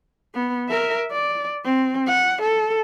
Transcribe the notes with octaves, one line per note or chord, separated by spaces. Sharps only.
B3
A#4 E5
D5
C4
F#5
A4